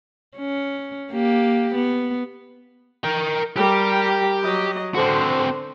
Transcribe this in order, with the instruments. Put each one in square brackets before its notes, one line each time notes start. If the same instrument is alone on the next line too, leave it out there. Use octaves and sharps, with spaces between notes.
[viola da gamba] C#4
A#3 G4
B3
[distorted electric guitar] A#4 G5
[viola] G3 A#4 [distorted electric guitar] G4
[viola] F#3 D#5
[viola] D3 C5 [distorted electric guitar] C4 F#4